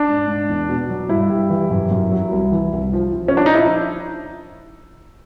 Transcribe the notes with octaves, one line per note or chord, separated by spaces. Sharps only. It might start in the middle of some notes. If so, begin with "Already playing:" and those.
Already playing: D4
G#2
G#2
E2
B2
F#3
G2 E4
G3
E3
F#2
F#2
F#3
C2
E3
C2
F3
F3
C#4
F3 D4
D#4
E4